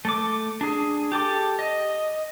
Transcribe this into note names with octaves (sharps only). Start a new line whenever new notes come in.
A3 D6
D4 G#4
G4 A4 D6
D#5